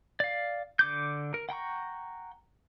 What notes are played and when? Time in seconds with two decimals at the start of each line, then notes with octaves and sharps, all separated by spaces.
0.20 D5 F5
0.79 D3 D6 G6
1.34 A#4
1.49 F#5 G5 A#5 C#6